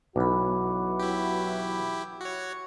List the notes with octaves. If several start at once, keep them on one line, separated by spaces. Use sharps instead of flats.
B1 E3 F#3 F#4 B5 D6
E4 G4
F#4 C#5